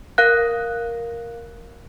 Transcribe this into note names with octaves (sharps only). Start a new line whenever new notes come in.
A#4 F5 F#6